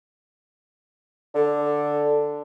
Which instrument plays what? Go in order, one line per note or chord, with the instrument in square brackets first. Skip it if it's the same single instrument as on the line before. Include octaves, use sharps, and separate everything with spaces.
[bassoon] D3 [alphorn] A4